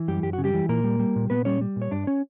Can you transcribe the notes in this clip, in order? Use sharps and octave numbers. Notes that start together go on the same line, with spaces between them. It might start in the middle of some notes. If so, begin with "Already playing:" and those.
Already playing: E3
F#2 G3 G4
F#2 G4
C#3 F#4
G3 G4
E3
A#2 A#3 A#4
G3
G3
A#2
A#2 B3 B4
G3 C#4 C#5
G3
A#2
C#5
G2 D4 D5
C#4 C#5